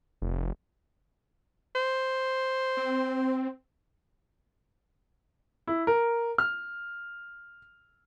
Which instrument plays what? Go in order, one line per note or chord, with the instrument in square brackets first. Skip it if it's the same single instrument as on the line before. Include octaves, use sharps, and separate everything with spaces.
[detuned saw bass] F1
[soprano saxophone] C5
[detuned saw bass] C4
[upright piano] E4
A#4
F6